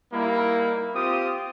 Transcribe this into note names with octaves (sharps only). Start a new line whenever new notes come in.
G3 A#3 D#4 E4
C4 F4 G4 D#6